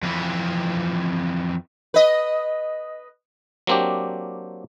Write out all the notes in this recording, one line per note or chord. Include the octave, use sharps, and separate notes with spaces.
F2 E3
B4 D#5
F#3 A#3 C4 D4 G4